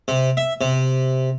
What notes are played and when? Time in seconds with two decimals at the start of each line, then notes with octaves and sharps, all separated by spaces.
0.08 C3
0.37 E5
0.61 C3